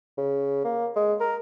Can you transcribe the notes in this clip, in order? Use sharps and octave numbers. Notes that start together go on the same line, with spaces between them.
C#3
A#3
G#3
A#4